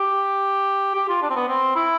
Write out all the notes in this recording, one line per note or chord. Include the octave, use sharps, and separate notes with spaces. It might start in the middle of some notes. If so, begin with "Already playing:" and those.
Already playing: G4
G4
F4
D4
C4
B3
C4
E4